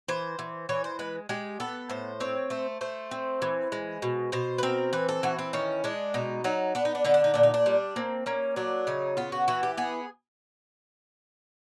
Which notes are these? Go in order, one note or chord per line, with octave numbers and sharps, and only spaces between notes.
E3 C5
E3
E3 C#5
C5
G#3 B4
G#3 G4
B3 A4
A2 C5
C4 C#5
A3 C5
A3 C5
C4
E3
G#3
B2
B2 C5
B4
C4 A#4
E3 B4
A4
E3 F#4
C4
D#3 C#4
G#3 D4
B2 D#4
F#3 D#4
B3 D4
D#4
D4
D3 D#4
D4
D#4
A#2 D4
D#4
D4
G3
A#3 C4
A#3 C#4
F#3 D4
C#3 D#4
B3 F4
F#4
E3 F#4
G4
B3 G#4